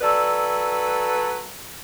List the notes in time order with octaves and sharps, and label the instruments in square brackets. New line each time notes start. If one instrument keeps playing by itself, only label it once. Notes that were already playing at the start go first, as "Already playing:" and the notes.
[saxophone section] F#3 A4 B4 [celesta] D5 E6